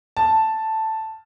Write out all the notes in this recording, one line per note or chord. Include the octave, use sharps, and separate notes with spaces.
A5